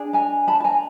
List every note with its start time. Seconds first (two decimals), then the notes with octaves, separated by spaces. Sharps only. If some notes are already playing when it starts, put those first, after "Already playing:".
Already playing: D4 G#4
0.13 G#5 A#5
0.48 A5 B5
0.60 A5
0.64 G#5 A#5